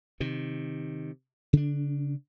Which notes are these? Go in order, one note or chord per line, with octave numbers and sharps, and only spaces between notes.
C3 D#3
C#3 D4